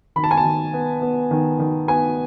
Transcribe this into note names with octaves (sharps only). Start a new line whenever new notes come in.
D#3 B5
A5
G#5
A5
D#3
B3
B3
D#3
D#3
B3 G#5